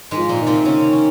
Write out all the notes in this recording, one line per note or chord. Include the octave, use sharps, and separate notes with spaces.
G#2 D#3 G#3
F3
A#2 A#3
D#3
C3 C4
C#3 C#4
C#4